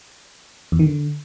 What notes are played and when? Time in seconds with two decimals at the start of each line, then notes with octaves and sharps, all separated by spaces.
0.72 E2
0.79 D#3
0.87 D3